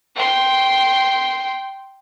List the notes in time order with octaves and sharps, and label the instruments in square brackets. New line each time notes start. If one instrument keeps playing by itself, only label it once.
[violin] G5 C6